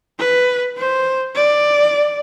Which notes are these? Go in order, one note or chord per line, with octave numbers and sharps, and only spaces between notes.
B4
C5
D5